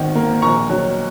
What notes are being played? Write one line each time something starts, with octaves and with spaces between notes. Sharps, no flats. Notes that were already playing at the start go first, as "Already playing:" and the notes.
Already playing: G#1 D#3
A#3
A#1 A#5 C#6
F#3